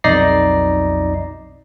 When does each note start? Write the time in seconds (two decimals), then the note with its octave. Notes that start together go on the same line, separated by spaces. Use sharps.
0.04 B1 F2 D#4 D5 A#6 C7